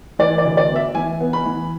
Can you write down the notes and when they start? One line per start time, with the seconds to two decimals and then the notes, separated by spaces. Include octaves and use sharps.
0.19 E3 D5
0.38 D5
0.45 D2
0.57 D5
0.69 B3
0.76 E5
0.95 E3 G#5
1.21 B3
1.33 B5
1.45 E3